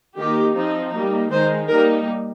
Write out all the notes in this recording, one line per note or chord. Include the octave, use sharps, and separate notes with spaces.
D#3 A#3 D#4 G4
F3 C4 D#4
G3 A#3 D#4
D#3 G#3 D#4 C5
G3 A#3 D#4 A#4